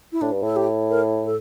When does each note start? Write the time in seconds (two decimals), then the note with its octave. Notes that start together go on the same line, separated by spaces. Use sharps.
0.12 E4
0.21 A2 D4
0.31 G2
0.42 A2 A4
0.56 G4
0.90 A#4
1.25 A4